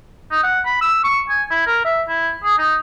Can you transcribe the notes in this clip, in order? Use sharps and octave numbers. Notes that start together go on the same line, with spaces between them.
D#4
F#5
B5
E6
C#6
G#5
E4
A#4
E5
E4
G#4
D#4